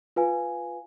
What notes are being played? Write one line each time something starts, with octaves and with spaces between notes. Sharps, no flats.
F4 B4 F5 G#5